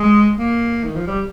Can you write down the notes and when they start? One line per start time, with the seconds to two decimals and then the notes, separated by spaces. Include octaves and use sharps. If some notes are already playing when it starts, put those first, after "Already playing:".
Already playing: G#3
0.39 A#3
0.84 D#3
0.96 F3
1.07 G3